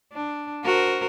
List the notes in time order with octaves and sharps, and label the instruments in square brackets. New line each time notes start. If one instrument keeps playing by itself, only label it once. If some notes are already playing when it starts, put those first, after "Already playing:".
[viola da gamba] D4
F#4 A#4 C5